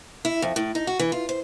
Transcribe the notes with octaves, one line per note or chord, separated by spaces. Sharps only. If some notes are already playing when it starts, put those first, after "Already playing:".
E4
F2
A2
D#4
F#4
E3
F4
C5